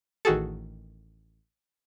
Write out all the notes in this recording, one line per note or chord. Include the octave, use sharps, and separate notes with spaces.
A1 D#3 F#4 G#4 A4